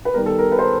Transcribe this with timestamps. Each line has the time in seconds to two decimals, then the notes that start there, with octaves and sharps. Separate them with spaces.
0.05 B4
0.14 D#3 G3 B3 A#4
0.26 A4
0.39 A#4
0.52 B4
0.59 C5